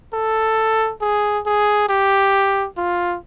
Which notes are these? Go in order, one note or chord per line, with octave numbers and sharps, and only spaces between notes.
A4
G#4
G#4
G4
F4